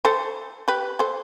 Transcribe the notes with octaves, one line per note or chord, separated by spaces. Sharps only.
A4 C5
G4 B4
A4 C5